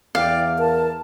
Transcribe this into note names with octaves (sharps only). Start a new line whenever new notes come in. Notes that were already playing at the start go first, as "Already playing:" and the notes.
E2 D5 F5 G5 D6
A#4 A5